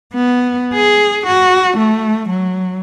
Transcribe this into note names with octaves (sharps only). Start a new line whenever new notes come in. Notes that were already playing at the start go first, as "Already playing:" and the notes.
B3
G#4
F#4
A3
F#3